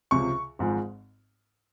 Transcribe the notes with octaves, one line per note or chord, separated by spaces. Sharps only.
C#2 C3 F3 C#6
G#1 G#2 F3 G#3